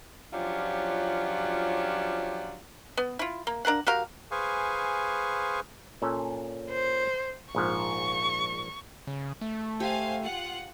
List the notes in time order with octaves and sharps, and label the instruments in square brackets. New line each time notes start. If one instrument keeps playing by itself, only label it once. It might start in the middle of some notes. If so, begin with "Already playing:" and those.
[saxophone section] F3 F#3 C#4 D4 F4 G4
[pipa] B3
E4 F4
A#3
D4 A#4 F5 F#5
F#4 G4 A#4 F5
[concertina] G#4 B4 C5 F5 G#5 C#6
[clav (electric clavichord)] A#2 C#4 A4
[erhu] C5
[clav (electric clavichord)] A#1 G#2 F3 [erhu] C#6
[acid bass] C#3
A3
[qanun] G4 [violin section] C5 F5 G#5
[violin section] F4 F#5